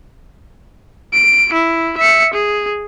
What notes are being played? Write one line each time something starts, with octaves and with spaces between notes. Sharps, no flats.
D7
E4
E5 C#7
G#4